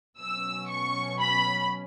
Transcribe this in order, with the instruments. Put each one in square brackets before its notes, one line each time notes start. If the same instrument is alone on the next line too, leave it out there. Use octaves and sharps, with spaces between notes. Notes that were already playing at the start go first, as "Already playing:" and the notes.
[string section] B2 F#3 C#4 E6
C#6
B5